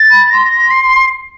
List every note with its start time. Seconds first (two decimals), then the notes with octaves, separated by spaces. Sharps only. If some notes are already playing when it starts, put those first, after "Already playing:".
Already playing: A6
0.11 B5
0.30 C6 A#6
0.71 C7